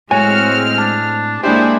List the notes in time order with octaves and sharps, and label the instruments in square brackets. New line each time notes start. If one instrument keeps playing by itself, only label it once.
[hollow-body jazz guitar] A2 G#5 [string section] G#3 C4 F6 [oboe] F#4 [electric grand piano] C#5
[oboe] D4 [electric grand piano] A5
[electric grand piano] G#3 D4 G4 [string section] A#3 E4 G#4 [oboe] C5